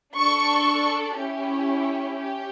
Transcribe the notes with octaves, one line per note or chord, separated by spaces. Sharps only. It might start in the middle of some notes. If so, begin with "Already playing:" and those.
D4 A4 C#6
C#4 E4 G4
C#4 G4